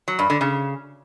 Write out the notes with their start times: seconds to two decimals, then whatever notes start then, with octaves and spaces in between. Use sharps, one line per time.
0.08 F#3
0.19 G2
0.30 D3
0.41 C#3